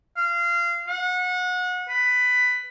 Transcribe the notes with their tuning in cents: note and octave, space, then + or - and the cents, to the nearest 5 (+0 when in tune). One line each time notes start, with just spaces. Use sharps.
F5 -25
F#5 -30
B4 +10